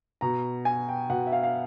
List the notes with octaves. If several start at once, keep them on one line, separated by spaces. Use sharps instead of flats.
B2 A#5
G#5
G5
B2 F#5
E5
F5
F5